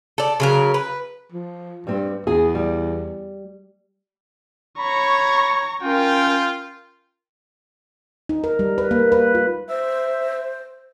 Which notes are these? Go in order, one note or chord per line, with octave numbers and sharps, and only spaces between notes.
A4 D5
C#3 F#3 A#4
B4
F3
G2 G3 C4
E2 G#4
G3
C#5 A#5 B5 C#6
C#4 F4 A#4 G5
D#4
A#4
G3
B4
A#3
B4
F4
C5 E5